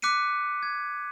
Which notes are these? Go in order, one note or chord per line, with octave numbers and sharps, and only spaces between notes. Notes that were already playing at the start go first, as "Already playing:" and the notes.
D6 F#6 B6 C#7 D#7
G#6